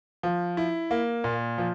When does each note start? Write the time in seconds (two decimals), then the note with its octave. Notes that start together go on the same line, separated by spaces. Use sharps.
0.23 F3
0.57 E4
0.91 A#3
1.24 A#2
1.58 F3